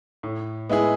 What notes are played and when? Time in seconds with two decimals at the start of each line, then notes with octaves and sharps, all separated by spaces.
0.23 A2
0.69 G#3 B3 E4 G#4